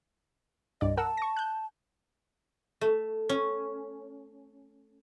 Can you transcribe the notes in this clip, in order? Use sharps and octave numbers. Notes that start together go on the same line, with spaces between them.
C2 G2 D5 D#5
A#4 F#5 A5 E6
C#6 A#6
F#6 G6
A3
C#4